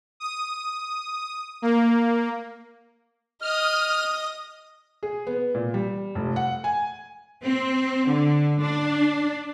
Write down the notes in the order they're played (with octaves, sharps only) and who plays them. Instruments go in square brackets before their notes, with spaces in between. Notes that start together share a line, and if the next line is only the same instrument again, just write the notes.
[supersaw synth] D#6
A#3
[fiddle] D#5 D#6 [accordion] F6
[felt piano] G#4
B3
A#2
G3
F1
F#5
G#5
[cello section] C4
D3
D4